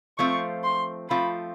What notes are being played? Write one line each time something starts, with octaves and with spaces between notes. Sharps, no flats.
F3 A3 C4 F4 C#6
C6
F3 A3 C4 F4 B5